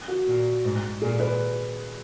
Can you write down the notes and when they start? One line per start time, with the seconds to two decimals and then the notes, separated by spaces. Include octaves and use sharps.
0.08 F#4
0.27 A#2
0.65 G#2
1.02 A#2 G#4
1.20 B4